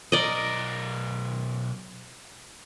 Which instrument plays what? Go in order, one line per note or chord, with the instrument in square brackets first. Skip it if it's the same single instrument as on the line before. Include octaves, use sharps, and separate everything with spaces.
[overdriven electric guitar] B1 A#4 [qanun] D5 D#5